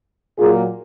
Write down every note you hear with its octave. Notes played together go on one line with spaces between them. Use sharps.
A#2 F#3 A#3 F4 G#4